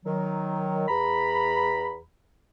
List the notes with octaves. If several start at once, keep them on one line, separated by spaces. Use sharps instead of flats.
D#3 F#3
E2 A#5 B5